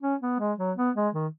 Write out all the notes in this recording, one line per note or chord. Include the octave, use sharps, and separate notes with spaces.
C#4
B3
G#3
F#3
B3
G#3
D#3